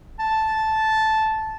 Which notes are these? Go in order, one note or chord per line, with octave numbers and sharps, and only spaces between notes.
A5